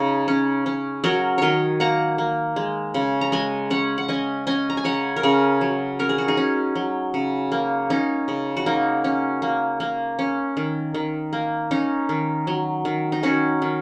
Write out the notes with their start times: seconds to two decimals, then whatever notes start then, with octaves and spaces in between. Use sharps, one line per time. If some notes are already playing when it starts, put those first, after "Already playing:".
Already playing: C#3 C#4 D#4 G#4
0.28 C#4
0.66 C#4
1.04 F#3 F#4 A#4
1.38 D#3 A#4 C#5 D#5
1.80 A#3 F#5 A#5
2.18 A#3
2.56 G#3
2.94 C#3
3.21 A#5
3.32 G#3 D#5 G#5
3.70 C#4 C#5 F#5
3.98 F#5
4.08 C#4 D#5 G#5
4.47 C#4 D#5 G#5
4.70 A#5
4.77 G#5
4.84 C#3 C#5 F#5
5.16 A#4
5.23 C#3 G#4 C#5
5.61 F#3
5.99 C#4 A#4
6.09 G#4
6.18 F#4
6.28 D#4 G#4
6.37 C#4
6.75 F#3
7.14 C#3
7.52 A#3
7.90 C#4 D#4
8.28 C#3
8.57 F#4
8.66 A#3 D#4
9.04 C#4
9.42 A#3
9.80 A#3
10.19 C#4
10.57 D#3
10.94 D#3
11.33 A#3
11.71 C#4 D#4
12.09 D#3
12.47 F#3
12.85 D#3
13.12 D#4
13.23 D#3 C#4 F#4
13.62 D#3